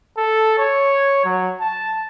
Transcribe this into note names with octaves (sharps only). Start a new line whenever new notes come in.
A4
C#5
F#3
A5